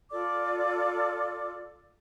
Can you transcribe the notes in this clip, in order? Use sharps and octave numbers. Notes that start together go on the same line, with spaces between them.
F4 A4 D5 D6